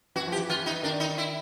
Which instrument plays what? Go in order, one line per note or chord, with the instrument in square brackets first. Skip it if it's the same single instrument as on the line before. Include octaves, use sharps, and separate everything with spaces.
[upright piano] E3 [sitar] F#4
[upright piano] F3
[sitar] G4
[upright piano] E3
[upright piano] E3 [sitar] F4
[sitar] D#4
[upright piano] D#3 [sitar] D4
[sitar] D#4
E4